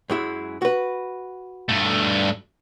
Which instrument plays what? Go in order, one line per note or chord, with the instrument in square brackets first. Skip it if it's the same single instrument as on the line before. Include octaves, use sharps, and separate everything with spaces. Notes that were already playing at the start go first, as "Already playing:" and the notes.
[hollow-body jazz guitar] F#2 G#3 E4
F#4 B4
[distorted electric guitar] G2 A3